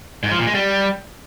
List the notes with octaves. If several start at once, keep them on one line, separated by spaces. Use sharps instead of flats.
G#2
F3
A#2
G#3
G3